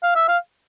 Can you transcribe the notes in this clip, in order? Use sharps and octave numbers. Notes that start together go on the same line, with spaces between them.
F5
E5
F5